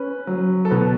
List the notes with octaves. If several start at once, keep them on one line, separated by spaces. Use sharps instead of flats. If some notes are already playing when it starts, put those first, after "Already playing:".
Already playing: C#4 B4
F#3
A4
B2 B4